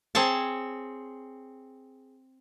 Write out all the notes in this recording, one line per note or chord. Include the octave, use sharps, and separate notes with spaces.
C4 G#4 C#5 A5